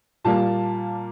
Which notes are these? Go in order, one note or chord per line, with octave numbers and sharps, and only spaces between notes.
A#2 G3 A#3 A5